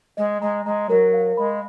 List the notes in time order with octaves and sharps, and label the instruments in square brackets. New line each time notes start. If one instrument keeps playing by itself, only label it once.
[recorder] G#3 [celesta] D#5
[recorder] G#3 [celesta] A#5
[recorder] G#3 [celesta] A#5
[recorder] F#3 [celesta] A#4
[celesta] F5
[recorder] G#3 [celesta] B5